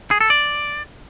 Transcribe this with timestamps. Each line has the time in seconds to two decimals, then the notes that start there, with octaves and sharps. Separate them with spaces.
0.11 G#4
0.21 A4
0.30 D5